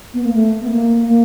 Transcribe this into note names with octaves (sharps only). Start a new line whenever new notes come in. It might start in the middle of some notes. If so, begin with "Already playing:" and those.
B3
A#3
A3
B3
A#3
A#3